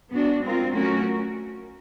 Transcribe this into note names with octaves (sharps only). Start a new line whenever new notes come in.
B3 D4 F#4
G#3 C4 F4 A#4
F#3 A3 C#4 F#4 A#4